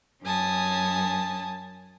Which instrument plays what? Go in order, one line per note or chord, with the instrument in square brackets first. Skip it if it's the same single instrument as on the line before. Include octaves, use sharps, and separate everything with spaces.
[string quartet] F#2 C#4 G#5 A5 D#6